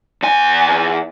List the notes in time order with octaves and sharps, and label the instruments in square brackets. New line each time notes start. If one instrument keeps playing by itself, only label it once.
[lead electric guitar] E2 G#5